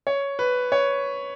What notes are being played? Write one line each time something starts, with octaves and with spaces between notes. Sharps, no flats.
C#5
B4
C#5